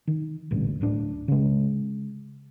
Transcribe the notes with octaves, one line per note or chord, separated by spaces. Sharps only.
D#3
A1 D2 G2 A#2
D1 A2 D4
C#3 G#3